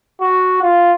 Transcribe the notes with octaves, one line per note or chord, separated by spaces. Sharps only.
F#4
F4